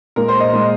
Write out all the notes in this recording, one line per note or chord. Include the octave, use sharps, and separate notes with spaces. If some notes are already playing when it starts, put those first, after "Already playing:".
A#2 G#3 A#4
C5
D#5
A#2 G#3